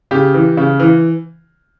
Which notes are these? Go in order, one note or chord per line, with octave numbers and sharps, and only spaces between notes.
C#3 G4
E3
C#3
E3